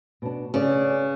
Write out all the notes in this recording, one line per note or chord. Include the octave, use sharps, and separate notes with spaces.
B2 D4
C#3 C#4 D5